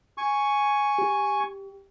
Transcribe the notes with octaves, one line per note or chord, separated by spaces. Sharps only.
G#5 C#6
G4